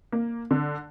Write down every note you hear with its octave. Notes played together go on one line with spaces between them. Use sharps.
A#3
D3